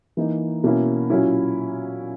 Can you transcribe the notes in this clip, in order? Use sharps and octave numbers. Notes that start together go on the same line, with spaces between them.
E3 A#3 D#4
B2 A#3 C#4 E4
A#2 F#3 C#4 E4